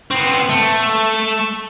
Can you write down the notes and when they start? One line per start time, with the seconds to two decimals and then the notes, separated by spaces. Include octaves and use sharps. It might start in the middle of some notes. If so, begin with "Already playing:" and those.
0.11 B3 C4
0.49 A3